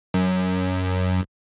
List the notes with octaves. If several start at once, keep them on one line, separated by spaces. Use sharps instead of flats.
F#2